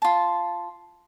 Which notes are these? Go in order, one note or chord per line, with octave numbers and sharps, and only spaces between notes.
F4 A5